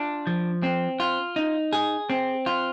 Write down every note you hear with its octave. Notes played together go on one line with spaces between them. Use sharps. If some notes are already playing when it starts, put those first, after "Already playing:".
Already playing: D4 F4
F3
C4
F4
D#4
G#4
C4
F4